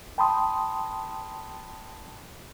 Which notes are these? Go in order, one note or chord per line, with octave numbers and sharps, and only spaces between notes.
G5 A5 B5 C6 D#6